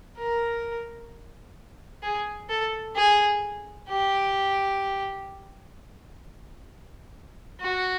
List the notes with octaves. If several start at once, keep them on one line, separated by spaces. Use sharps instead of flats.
A#4
G#4
A4
G#4
G4
F#4